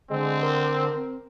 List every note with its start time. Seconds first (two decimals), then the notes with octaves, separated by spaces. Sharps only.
0.10 D3 G#3 C4
0.43 A#4
0.94 C4